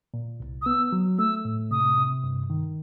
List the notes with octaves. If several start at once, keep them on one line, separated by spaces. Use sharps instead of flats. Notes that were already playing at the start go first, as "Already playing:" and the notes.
A#2
C2
D#6
B3 E6
F#3
A3 E6
A2
C3 D#6
C3
G2
D#3